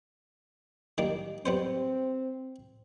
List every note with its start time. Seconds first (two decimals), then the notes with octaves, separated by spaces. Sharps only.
0.98 D#3 G3 A#3
1.46 G3 B3 C4 C5